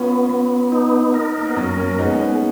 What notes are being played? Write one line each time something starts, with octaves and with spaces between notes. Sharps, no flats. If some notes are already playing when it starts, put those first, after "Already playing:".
Already playing: B3 C#4 F4
B3
D#4
A#4
A#3
B3
F#2 A#3 C#4
A#3 C#4
G#3 B3 D#4
B3 D#4